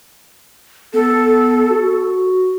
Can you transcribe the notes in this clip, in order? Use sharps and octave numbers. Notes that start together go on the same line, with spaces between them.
B3 A4
F#4